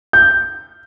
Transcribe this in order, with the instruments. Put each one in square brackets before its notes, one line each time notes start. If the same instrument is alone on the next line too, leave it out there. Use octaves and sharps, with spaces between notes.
[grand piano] G6